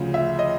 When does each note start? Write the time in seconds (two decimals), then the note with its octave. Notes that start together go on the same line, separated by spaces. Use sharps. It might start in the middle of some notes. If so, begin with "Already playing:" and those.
Already playing: D2 C#3 F3
0.14 E5
0.39 D#5